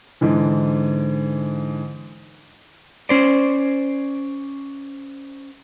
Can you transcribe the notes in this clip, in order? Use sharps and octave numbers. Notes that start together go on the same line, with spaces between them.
G#2 D3 E3
C#4 C5 D5